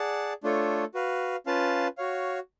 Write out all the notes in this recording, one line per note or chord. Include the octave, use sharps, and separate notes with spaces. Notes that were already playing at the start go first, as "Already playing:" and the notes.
Already playing: G#4 D5 F#5 A5
A3 D4 F4 A4 C#5
F#4 B4 F5
C#4 F4 B4 F5 A5
F#4 C#5 F5